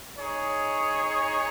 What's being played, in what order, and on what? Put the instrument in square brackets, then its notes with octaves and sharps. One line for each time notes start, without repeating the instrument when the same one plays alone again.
[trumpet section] D#4 G#4 C#5